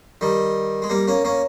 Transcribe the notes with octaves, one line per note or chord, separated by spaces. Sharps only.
D#3 G3
G#3
G3 A#3
A#3 C#4
A#3 C#4